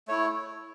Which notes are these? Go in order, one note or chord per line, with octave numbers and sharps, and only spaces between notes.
A3 E4 C#5